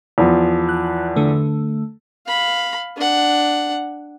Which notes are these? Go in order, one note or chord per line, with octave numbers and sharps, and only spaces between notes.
E2 F3
F#6
D3 A3
F5 B5
D4 F#5